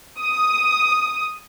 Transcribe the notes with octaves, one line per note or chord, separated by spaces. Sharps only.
D#6